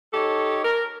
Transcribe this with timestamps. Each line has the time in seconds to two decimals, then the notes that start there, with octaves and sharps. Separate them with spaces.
0.14 D#4 G4 A4 C#5
0.65 A#4